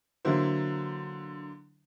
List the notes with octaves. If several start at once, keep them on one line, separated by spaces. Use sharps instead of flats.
D3 F#3 A#3 E4 C5